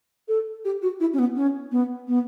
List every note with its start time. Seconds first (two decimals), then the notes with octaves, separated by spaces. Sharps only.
0.28 A4
0.65 G4
0.82 F#4
1.00 E4
1.13 C#4
1.19 B3
1.36 C#4
1.72 B3
2.08 B3